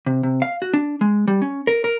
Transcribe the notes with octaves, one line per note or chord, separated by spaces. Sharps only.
C3
C3
F5
F#4
D4
G#3
G3
C#4
A#4
A#4